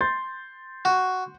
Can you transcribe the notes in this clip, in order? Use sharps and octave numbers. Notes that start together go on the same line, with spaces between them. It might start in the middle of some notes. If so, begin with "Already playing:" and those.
C6 G6 A6
F#4